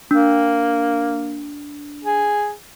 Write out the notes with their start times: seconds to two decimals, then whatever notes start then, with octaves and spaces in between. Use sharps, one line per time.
0.11 A#3 D4
2.04 G#4